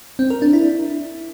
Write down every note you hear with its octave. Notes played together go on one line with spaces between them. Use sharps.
C4
A#4
D4
E4